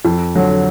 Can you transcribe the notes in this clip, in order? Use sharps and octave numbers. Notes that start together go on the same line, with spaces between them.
F2
D3 F#3